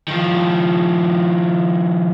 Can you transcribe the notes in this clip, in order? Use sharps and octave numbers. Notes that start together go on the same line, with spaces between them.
D#3 F3